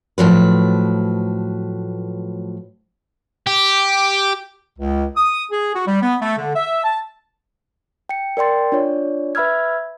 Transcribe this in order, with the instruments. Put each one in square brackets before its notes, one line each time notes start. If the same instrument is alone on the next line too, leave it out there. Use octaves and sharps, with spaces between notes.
[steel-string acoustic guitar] A2 F3 F#3 B4
[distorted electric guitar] G4
[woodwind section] C#2
D#6
G#4
F#4
G3
B3
A3
D3
E5
A5
[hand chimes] G5 C#7
A#4 D5 G5 C6 A6
D4 F4 C#5 D5
B4 E5 B5 E6 F6 G#6